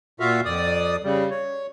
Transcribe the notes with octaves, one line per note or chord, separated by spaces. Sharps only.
A#2 F4 F#4 E5 F5
F2 D5 D#6
C#3 G3
C#5